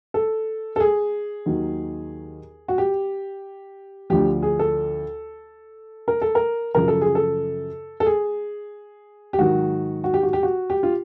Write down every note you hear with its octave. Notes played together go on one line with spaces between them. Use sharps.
A4
A4
G#4
D#2 D#3 F#3
F#4
G4
D2 D3 F3 G4
G#4
A4
A#4
A4
A#4
F#2 C#3 F3 A#4
A4
G#4
A4
A4
G#4
G4
G#2 D#3 F#3 F#4
F#4
G4
F#4
G4
F#4
G4
F4